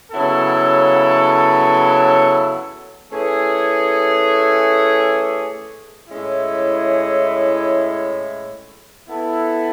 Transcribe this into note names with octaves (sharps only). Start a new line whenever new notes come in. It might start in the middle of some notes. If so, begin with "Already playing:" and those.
C#3 F#3 B3 E4 A4
E3 A3 C#4 G#4
A2 G#3 C#4 E4
E3 B3 E4 A4